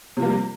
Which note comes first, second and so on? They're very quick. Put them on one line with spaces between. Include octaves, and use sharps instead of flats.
C3 F3 A#3 G3